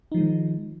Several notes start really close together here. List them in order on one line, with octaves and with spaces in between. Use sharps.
D#4 F3 G#3 D#3